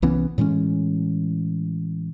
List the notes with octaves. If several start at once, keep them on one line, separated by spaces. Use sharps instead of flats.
C2 E3 B3 C#4
A2 E3 G#3 C#4